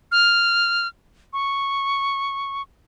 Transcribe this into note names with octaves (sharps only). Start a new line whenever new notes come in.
F6
C#6